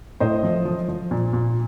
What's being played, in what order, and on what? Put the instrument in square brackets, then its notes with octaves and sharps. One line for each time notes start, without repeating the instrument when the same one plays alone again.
[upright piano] A2 C5 D#5
F3
F3
F3
A#2
A#2